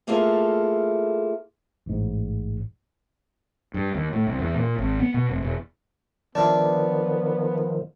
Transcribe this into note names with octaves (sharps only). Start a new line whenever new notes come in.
A3 A#3 E4 F4 G#4 A4
A1 G#2
G2
D#2
A2
C2
E2
A#2
G#1
B3
B2
F1
E1
D#3 F3 B3 D4 F4 D5 E5